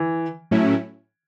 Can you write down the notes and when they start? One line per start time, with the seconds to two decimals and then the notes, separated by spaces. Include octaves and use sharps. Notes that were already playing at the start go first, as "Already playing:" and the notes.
Already playing: E3
0.51 A2 F#3 A3 C#4 E4